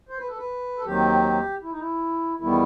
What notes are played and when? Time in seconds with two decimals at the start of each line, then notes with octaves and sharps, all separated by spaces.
0.09 C5
0.19 B4
0.28 A4
0.37 B4
0.77 A4
0.86 D#2 D#3 F#3 C4 G4
1.62 E4
1.71 D#4
1.79 E4
2.40 E2 D#3 G3 B3 E4